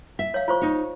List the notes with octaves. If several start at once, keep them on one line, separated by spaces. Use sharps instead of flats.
E5
C#5 F5
F4 C5 C#6
D#4 C#5